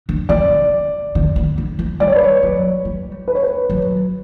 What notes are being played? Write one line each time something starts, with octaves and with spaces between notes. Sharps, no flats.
D3
C#3 D5
D3
D3
D3
E3
G3 D5
C#5
B4
C#5
F#3
G3
B4
C#5
B4
F#3